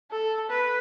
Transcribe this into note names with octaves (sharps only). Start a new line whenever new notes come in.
A4
B4